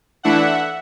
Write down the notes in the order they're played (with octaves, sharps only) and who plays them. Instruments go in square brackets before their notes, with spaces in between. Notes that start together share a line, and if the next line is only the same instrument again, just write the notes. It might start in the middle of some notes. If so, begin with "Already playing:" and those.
[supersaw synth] E3 A3 D4 E5 F#5